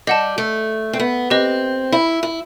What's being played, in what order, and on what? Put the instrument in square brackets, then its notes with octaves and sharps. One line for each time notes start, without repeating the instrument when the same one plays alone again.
[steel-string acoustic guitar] G3 [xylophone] D#5 F#5 A5
[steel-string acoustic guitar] A3
C4
B3
[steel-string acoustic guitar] C4 [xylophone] G4 B4 D#5
[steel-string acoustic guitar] E4
E4